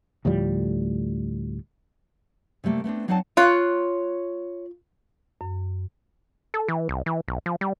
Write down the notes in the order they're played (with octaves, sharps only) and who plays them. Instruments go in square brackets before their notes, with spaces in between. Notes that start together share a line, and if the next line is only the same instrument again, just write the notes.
[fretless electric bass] D2 A2 F3 G3
[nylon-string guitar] C3 G3 A3 A#3
A3 B3 C4 D4
F#3 C4 D#4 D5 F#5 A5
[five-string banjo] F4 [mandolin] C#5 C6 F#6
[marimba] F#2
[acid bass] A4
E3
C2
E3
B1
F3
G3